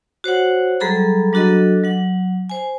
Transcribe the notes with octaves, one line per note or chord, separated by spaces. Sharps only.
F#4 C5 C#5 F#5
F#3 G3 G#4 A4 A#5 B5
F#3 D4 F#4 A4 D#5
F#3 F#5
C5 G#5